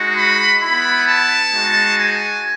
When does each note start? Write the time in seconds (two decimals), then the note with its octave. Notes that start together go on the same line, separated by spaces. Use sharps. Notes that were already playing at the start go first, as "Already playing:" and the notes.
Already playing: G#3 D#4 F#4
0.18 B5
0.62 B3 E4 B5
1.07 A5
1.52 G#3 D#4 F#4
1.98 G#5